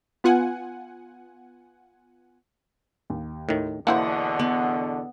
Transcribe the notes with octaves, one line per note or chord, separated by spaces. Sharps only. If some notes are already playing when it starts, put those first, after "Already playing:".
B3 F4 F#5 G#5
D#2
A2 D#3
E2 B2 D3 A#3 E4 C5 F#5
B3